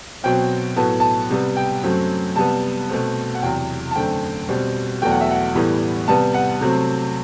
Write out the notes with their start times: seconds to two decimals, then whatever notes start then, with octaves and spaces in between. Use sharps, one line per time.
0.24 B2 F#3 C4 G5
0.76 A2 F#3 B3 A5
1.00 A5
1.30 C3 G3 B3
1.56 G5
1.83 F#2 F#3 A3 C4
2.36 C3 G3 B3 A5
2.90 B2 A3 C4
3.35 F#5
3.42 E2 C3 F#3 G5
3.91 A5
3.95 F#2 D3 A3 C4 G5
4.49 B2 G3 C4
5.02 E2 B2 F#3 A3 G5
5.12 F#5
5.21 E5
5.31 F#5
5.55 A2 E3 G3 B3
6.08 C3 G3 B3 A5
6.34 F#5
6.61 C3 F#3 A3 C4